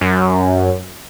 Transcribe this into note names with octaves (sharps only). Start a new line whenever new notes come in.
F#2